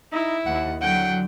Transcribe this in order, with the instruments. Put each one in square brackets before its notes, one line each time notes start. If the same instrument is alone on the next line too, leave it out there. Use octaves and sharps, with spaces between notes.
[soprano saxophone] D#4 [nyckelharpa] E4
[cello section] D#2 [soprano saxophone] F#5
[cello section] D3 F#3 [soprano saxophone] F#5 [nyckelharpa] G5